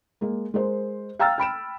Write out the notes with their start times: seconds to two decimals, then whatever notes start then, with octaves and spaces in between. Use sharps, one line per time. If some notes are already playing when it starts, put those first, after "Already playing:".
0.21 G#3 A#3
0.54 G#3 A#4 C5
1.19 F5 G5 A#5 E6 F6 A6
1.38 G5 B5 D7 E7